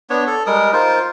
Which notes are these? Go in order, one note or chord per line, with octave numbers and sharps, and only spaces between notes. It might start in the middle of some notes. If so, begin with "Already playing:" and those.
B3 D4 C#5
A4
G3 G#3 A#4 D#6
D#4 F4 A#4 C5